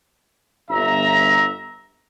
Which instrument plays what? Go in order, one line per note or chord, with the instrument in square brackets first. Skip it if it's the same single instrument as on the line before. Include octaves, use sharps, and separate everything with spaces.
[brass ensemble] G1 E5 A#5